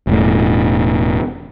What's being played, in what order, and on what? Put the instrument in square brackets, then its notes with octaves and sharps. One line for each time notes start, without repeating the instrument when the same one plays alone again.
[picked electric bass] E1 A2